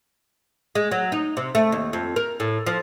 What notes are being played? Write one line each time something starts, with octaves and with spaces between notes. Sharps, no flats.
G#3
F#3
D#4
C3
A3
D#2
F2
A#4
A2
F3